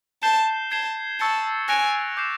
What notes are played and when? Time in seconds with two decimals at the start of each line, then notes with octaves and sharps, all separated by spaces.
0.23 A5 G6 C7 E7 G7
0.71 A5 G#6 C7 E7 G7
1.20 A5 C#6 E6 A6 C#7 E7
1.69 G#5 F#6 A#6 D7 F7
2.17 D6 G6 C7 E7